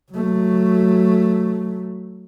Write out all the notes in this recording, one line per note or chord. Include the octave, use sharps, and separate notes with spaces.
F#3 A3